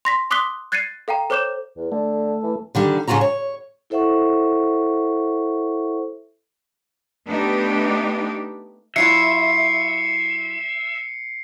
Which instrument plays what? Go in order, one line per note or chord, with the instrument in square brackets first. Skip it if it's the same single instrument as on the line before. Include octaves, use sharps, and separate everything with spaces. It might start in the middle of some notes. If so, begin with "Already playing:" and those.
[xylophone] C6 A#6 B6
C6 D6 D#6 F#6 B6 G7
F#6 G#6 A6 C7 C#7 D#7
A4 F5 G5 A#5
A4 C5 C#5 D6 G6 E7
[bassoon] E2
[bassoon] D3 [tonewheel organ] A3
[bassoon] E3
[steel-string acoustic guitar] D3 D#3 G3
A2 C#3 A3 F4 F#4 A#5
C#5
[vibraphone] E4 A4 C5 E5 F#5 C#6
[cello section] A3 B3 D4 D#4 G4
[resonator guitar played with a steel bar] F#3 E4 F4 [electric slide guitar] E5 [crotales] C7 C#7